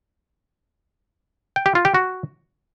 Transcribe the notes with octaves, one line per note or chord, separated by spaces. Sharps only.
G5
G4
F4
G4
F#4